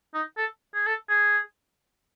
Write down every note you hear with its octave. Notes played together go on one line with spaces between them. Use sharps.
D#4
A4
G#4
A4
G#4